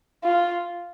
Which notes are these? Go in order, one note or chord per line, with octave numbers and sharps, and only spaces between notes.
F4